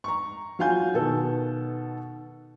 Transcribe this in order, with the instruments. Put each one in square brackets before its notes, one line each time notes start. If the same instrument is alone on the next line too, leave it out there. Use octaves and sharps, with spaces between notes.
[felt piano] A#5 C#6
F#3 F4 F5 G#5 G6
B2 D#3 B3 A4